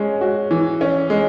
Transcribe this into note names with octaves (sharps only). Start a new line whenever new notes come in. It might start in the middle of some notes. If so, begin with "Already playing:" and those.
Already playing: G#3 C#4
F#4
E3
C#4
G#3